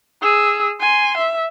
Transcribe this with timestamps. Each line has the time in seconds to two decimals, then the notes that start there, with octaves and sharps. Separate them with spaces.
0.23 G#4 E6
0.80 G#5 C6
1.17 E5